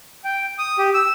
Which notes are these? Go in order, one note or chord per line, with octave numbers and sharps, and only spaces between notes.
G5
D#6
G4
E6